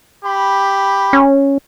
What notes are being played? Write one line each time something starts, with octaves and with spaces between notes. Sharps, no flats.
G4 B5
C#4